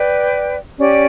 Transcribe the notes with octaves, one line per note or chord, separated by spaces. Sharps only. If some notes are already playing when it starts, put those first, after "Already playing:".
Already playing: B4 D5 G5
C#4 G4 D5